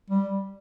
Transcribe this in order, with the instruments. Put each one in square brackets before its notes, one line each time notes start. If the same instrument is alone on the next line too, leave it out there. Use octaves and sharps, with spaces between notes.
[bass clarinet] G3